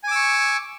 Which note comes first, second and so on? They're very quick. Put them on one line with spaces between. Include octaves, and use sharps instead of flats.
G#5 D6 E6 C#6